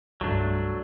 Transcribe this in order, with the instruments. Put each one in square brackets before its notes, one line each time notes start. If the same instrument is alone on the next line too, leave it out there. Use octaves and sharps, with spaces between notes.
[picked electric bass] C2 G2 [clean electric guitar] F#3 A3 D4